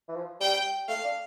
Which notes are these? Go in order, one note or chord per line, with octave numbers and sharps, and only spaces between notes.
E3
F3
G3 G5
A3 F5
D4